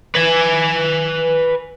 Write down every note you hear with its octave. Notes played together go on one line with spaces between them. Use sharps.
B4 G#5